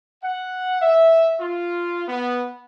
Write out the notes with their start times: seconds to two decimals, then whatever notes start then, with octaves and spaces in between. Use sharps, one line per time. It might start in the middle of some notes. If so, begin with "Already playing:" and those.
0.23 F#5
0.81 E5
1.40 F4
2.08 B3